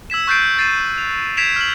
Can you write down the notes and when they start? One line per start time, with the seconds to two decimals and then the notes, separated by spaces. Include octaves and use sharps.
0.10 E6 G#6 B6 E7
0.27 C#6 F#6 G6 A6 C7 D7
0.58 G6 A6 C7 D#7 E7
0.98 F7
1.37 G#6 B6 C7 D7 E7 F7
1.56 F6 F#7